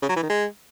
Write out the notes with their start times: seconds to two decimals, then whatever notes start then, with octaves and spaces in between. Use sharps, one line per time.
0.02 C#3
0.09 F#3
0.16 E3
0.23 D#3
0.30 G#3